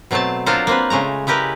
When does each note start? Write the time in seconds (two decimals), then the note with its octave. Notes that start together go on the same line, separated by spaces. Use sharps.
0.11 B2 F#3 A3 C4 A5
0.46 F#3 D4 F4 A4 A#4 C5
0.67 A#3 C4 B4
0.90 C#3 G#3 A3 A#5
1.27 G#3 E4 G4 A#4 B4